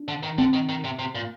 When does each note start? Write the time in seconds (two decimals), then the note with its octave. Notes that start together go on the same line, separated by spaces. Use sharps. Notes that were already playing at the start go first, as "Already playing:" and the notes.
Already playing: D4
0.08 D3
0.23 D#3
0.38 D3 C4
0.53 D#3
0.69 D#3
0.84 C3
0.99 C3
1.15 A#2